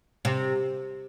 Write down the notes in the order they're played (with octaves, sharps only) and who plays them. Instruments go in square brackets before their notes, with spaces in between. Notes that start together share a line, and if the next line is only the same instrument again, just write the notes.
[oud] C3